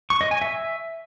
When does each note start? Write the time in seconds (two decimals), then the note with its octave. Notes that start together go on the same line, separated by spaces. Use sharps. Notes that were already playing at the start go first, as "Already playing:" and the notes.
0.10 C#6
0.21 D#5
0.31 G#5
0.42 E5